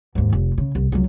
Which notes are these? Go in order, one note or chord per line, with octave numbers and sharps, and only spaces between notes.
D#2 G#2
F1
C#3
C2
C#2 F#3